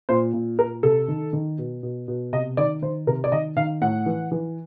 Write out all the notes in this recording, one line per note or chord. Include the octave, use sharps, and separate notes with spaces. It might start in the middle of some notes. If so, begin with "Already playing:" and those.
A#2 C5
A#2
A#2 A#4
C3 A4
D#3
D#3
B2
B2
B2
C3 D#5
D#3 D5
D#3 C5
C3 A#4
D5
D#3 D#5
D#3 F5
A2 F#5
E3
E3